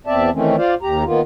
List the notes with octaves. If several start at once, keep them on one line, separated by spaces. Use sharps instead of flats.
E2 C4 D5 E5 A5
D#3 E3 A3 C4 C#4
F4 C5 D5 F5
D#2 G4 A#5
D#3 A#3 B3 F4